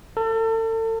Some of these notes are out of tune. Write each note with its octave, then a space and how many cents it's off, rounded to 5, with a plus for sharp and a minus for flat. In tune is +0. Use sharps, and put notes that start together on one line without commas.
A4 +35